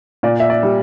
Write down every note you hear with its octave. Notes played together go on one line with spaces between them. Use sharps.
A#2 D5
E5
D5
G3